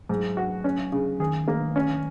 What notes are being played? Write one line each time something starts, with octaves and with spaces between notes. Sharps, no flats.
G#2 F#3
F#4
C#4
C#3
D#3 G#4
A#3
C#4